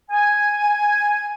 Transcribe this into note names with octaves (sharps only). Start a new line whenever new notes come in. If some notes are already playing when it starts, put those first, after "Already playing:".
G#5